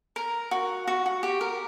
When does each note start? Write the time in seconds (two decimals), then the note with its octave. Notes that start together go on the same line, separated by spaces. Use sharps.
0.16 A#4
0.51 F#4
0.87 F#4
1.06 F#4
1.23 G4
1.41 A#4